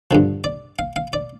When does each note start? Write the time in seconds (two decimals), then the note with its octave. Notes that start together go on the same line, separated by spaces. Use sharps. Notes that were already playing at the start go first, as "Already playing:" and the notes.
0.11 G2 D3 F3
0.44 D5
0.79 F5
0.96 F5
1.13 D5